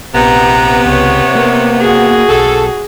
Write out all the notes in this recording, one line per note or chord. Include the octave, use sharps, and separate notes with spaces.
A#1 C3 B3 A#5
C#2 C#5
A#3
F#4 G#4
B1 A4